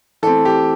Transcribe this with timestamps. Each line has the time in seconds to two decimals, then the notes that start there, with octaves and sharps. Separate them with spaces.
0.23 E3 A3 C4 A4
0.45 G4